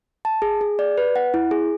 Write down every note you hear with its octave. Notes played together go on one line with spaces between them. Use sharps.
A5
G#4
G#4
D5
B4
F#5
E4
G#4